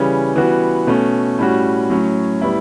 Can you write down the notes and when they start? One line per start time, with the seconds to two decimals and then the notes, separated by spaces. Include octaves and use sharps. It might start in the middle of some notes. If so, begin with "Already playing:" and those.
Already playing: C#3 E3 G3 C#4
0.36 E3 G3 B3 F#4
0.87 B2 A3 C#4
1.39 A2 G3 C#4 F#4
1.90 A2 F#3 C#4
2.42 A2 G3 B3 E4